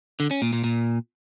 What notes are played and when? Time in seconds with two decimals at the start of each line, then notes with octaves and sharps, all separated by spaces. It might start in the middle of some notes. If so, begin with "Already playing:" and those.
0.20 D3
0.31 C#4
0.42 A#2
0.53 A#2
0.64 A#2